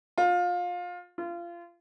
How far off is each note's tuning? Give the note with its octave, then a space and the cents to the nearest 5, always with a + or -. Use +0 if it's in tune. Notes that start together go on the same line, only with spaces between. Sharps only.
F4 +25
F4 -25